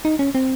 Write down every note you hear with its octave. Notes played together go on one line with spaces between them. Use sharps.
D#4
C#4
C4